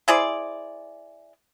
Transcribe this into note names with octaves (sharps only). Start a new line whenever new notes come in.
E4 G#4 C5 D5